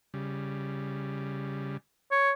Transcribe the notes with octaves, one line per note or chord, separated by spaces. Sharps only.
C#3 G3
C#5